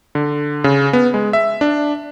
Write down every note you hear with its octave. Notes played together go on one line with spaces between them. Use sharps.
D3
C#3
B3
G#3
E5
D4